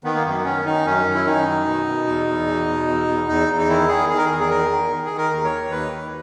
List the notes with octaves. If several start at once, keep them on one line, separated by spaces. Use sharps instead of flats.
D#3 B3
A#3
F#2 B3
D#3 C#4
D#3 D#4
F#2 C#4
F#2
E4
D#3 D#4
F#2
B2
B2
E2
E2
B2
B2
E2
E2
E2 D#4
E2
D#4
D#3 E4
D#3 G#4
D#3 G#4
A#4
E2 G#4
G#4
D#3 A#4
D#3
D#3
G#4
D#3
A#4
D#2
C#5
D#3
D#2 B4
D#3